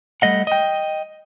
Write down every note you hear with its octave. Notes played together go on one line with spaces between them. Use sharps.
G3 A3 D#5 F#5
D#5 G5